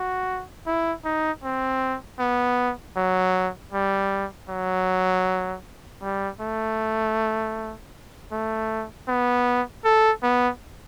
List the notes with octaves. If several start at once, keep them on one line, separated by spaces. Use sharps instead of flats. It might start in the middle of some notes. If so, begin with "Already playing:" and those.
Already playing: F#4
E4
D#4
C4
B3
F#3
G3
F#3
G3
A3
A3
B3
A4
B3